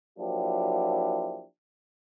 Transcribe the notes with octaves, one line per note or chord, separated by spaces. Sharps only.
F3 F#3 A#3 D4 E4 G4